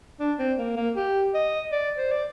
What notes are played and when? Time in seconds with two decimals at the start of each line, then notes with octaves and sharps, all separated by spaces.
0.20 D4
0.39 C4
0.58 A#3
0.77 A#3
0.96 G4
1.34 D#5
1.72 D5
1.98 C5
2.12 D5